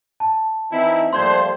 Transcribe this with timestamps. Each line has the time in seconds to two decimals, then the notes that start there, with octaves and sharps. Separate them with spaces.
0.20 A5
0.72 E3 C4 D#4 E4
1.13 F3 G3 A3 A#3 C5 C6 G#6